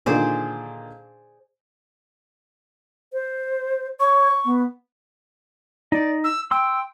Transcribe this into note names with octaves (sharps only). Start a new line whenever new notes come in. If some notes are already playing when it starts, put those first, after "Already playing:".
A#2 D3 D#3 G#4 C5 D5
C5
C#5 C#6
B3
D#4 D5
E6
G5 C6 E6